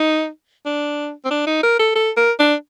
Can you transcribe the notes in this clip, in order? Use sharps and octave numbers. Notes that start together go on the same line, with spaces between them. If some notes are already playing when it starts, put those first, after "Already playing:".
Already playing: D#4
D4
C4
D4
D#4
A#4
A4
A4
A#4
D4